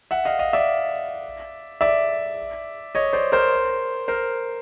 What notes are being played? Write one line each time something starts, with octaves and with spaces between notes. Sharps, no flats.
E5 F#5
D#5 F5
D#5 F5
D5 E5
D5 E5
C#5 D#5
C5 D5
A#4 C5
A#4 C5